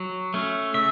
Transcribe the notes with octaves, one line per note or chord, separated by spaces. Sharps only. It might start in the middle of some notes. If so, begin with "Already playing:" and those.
Already playing: F#3
A3 C#4
C#3 E5